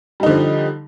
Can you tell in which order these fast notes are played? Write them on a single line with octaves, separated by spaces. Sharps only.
G3 D#4 D3 F3